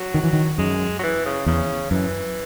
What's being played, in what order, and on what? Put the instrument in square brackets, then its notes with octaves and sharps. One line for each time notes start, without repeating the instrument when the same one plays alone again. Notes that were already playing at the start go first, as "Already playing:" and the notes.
Already playing: [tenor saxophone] F#3
[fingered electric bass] D#3
E3
D#3
[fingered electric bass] F#2 [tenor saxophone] G#3
[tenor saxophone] F#3
E3
C#3
[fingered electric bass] E2 [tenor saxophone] C#3
[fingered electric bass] F#2 [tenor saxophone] E3